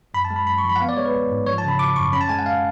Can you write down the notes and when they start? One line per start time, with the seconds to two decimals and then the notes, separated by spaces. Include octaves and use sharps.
0.14 F#2 B5
0.25 A5
0.31 G#3
0.36 B5
0.47 F#2 B5
0.58 C#6
0.64 F3
0.69 B5
0.76 F#5
0.80 B3 F5
0.89 D5
0.96 G#3 C#5
1.06 B4
1.14 A1
1.30 G#2
1.46 F3 C#5
1.58 A5
1.64 C#3 B5
1.79 G#1 D6
1.96 F#2 C#6
2.13 C#4 B5
2.21 A5
2.29 G#3 G#5
2.39 F#5
2.46 F5